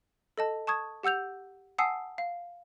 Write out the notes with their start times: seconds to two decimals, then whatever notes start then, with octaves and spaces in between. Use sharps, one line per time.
0.38 A4 D#5 A5
0.67 A5 C#6 D#6 G#6
1.03 G4 F#5 E6 G6 F7
1.78 F#5 G#5 A5 D#6 E6 C7
2.18 F5